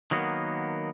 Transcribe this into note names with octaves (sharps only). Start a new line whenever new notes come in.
D#3 F#3 A#3 B3